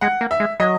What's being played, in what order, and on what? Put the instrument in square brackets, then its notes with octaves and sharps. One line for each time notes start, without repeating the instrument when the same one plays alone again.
[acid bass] G#3 [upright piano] F#5
[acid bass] A#3
[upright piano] E5
[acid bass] G#3
[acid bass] F#3 [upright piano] D#5